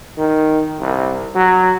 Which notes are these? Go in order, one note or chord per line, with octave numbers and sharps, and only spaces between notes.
D#3
C2
F#3